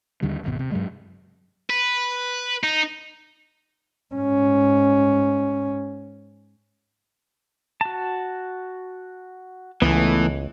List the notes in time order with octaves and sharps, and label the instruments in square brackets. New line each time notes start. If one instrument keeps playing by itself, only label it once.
[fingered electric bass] D#2 D3 G3
D#1 G#1 B2
C3
G2 F#3 G#3
[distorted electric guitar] B4
D#4
[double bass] G#2 C#4
[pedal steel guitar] F#4 A5
[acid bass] C#2 [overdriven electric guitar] E3 [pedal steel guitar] A3 B3